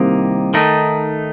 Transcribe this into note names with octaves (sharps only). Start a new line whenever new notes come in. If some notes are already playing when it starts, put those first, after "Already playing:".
Already playing: C2 C3 D#3 A#3 D#4
D#3 A3 D#4